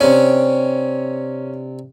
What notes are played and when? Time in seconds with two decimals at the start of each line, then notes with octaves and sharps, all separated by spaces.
0.01 C3 C#4 D4